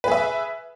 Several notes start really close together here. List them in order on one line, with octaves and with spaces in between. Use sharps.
B4 G#4 E5